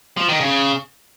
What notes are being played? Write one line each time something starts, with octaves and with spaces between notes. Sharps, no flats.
F3
D#3
C#3